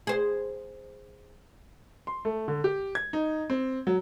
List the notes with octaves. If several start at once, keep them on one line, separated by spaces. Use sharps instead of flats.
G#4 C5
C6
A3
D3
G4
G#6
D#4
C4
F#3